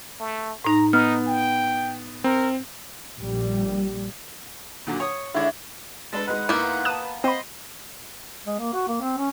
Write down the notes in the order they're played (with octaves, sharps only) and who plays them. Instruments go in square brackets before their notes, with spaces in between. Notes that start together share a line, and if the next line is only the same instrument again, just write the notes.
[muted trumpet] A3
[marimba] A2 D#4 [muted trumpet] A#5
[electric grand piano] B3 [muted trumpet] D#4 [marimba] F6
[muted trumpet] G5
[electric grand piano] C4 [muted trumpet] A#4
[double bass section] A#1 G3
[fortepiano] A#2 D3 F#3
C#5 D#6
[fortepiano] D3 G#3 D4 [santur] E4 C#5
[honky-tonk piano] G#3 D4 B4 [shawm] A4
[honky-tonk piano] G#3 D#4 B4 [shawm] F#5
[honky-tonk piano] G#2 E4 G6 [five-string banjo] A#3 B3
[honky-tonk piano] B4 A5 [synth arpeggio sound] D#6 F#6 E7
[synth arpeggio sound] C4 B5 [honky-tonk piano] C5 [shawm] D#5
[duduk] G#3
A#3
F#4
A#3
C4
C#4